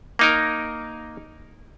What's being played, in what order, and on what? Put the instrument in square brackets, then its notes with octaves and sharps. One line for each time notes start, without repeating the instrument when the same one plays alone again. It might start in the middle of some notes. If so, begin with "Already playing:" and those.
[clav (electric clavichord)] A#3 D#4 A#4